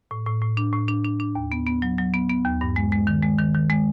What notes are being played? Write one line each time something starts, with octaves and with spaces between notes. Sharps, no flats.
A2
A2
A2
D4
A2
D4
D4
D4
D#2
B3
B3
F#3
F#3
B3
B3
D#2
G2
G#3
G#3
D#3
G#3
D#3
D#3
G#3